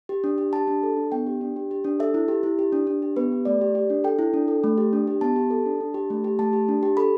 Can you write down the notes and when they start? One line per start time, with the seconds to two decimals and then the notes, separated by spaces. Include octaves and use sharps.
0.09 G4
0.24 D4
0.38 G4
0.53 G4 A5
0.67 D4
0.83 A4
0.97 D4
1.12 B3 G5
1.27 G4
1.41 D4
1.56 G4
1.71 G4
1.84 D4
2.00 A4 E5
2.14 E4
2.28 G4
2.43 E4
2.59 G4
2.72 D4
2.87 D4
3.02 G4
3.16 B3 B4
3.32 G4
3.45 A3 D5
3.61 G4
3.75 G4
3.90 D4
4.04 A4 G5
4.19 E4
4.33 D4
4.48 A4
4.64 A3
4.78 G4
4.93 D4
5.07 G4
5.21 B3 A5
5.36 G4
5.50 A4
5.66 D4
5.80 D4
5.94 G4
6.10 A3
6.24 G4
6.39 A3 A5
6.53 G4
6.68 D4
6.83 G4
6.97 A4 B5